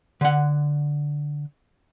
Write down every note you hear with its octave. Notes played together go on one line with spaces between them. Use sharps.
D3 F#5